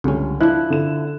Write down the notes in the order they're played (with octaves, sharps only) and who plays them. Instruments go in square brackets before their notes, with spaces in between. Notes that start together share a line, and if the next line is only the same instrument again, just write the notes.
[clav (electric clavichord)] C#2 C#4 [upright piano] D3 G3 A3
[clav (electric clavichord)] F3 D4 [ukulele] E4 [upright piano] F#6
[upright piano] D3 A4 E7